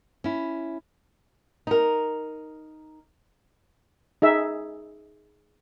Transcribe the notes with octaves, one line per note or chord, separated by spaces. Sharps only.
C#4 E4
D#4 A#4
D#4 G#4 E5